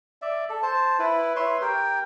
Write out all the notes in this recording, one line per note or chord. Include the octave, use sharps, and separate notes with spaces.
D5 E5
A4
C5 A5
E4 B4
B4 C#5 E5 C6
G4 A#4 G5